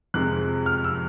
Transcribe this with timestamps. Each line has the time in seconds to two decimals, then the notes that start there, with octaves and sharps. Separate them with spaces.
0.14 F2 C3 F3 G#3 F#6
0.66 F6
0.84 E6